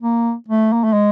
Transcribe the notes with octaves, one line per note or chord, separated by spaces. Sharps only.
A#3
A3
A#3
A3
G#3